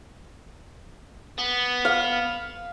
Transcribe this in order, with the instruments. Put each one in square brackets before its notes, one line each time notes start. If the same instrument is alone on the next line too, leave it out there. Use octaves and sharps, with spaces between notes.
[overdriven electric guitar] B3
[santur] F5